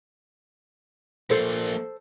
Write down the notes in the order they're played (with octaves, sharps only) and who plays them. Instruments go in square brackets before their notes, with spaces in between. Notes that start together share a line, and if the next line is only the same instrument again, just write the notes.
[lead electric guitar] F3 A#3 [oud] A4 C5